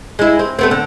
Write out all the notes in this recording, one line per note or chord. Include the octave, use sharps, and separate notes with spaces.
G#3 E4
C4
A3 B3 C4
D3